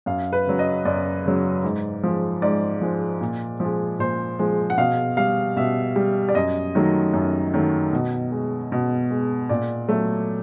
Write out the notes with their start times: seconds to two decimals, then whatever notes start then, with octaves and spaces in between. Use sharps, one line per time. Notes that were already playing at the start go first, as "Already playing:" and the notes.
0.06 F#2 F5
0.33 B4
0.47 C#3 F#3
0.59 D#5
0.85 F#2 D5
1.25 C#3 F#3
1.63 G#2
2.04 F3 G#3
2.42 G#2 D5
2.81 F3 G#3
3.21 A#2
3.60 F3 G#3
3.99 A#2 C5
4.39 F3 G#3
4.70 F#5
4.78 B2 F5
5.17 G3 F5
5.56 B2 E5
5.96 G3
6.29 D5
6.35 F#2 D#5
6.75 D#3 F#3 A3
7.14 F#2
7.54 D#3 F#3 A3
7.93 B2
8.31 G#3
8.72 B2
9.11 G#3
9.49 A#2 D5
9.89 F#3 A3